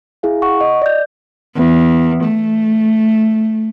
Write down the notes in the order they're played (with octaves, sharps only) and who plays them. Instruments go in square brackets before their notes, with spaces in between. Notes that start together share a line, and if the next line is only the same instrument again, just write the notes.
[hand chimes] E4 G#4 F5
F#5 C#6
D#5
D5 G6
[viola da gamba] E2
A3